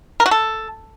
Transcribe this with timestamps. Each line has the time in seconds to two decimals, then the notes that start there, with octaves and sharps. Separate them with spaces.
0.20 A#4
0.26 F#4
0.31 A4